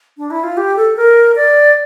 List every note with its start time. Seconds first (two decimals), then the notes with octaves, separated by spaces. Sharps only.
0.18 D4
0.31 E4
0.43 F4
0.57 G4
0.76 A4
0.97 A#4
1.36 D5